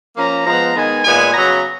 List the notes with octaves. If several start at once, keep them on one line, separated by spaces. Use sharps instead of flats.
F3 A#3 C#4 A#5
F3 G#3 B3 A#5
D#3 G#3 B3 G#5
A#2 G#3 B3 G#5
C#3 F#3 B3 A#5